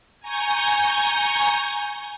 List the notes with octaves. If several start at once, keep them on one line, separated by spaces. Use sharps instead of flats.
G#5 A#5 C#6 G6 A#6